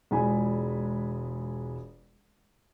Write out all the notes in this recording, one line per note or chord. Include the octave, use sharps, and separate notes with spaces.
E1 G#3 E4 F4 G#5 B5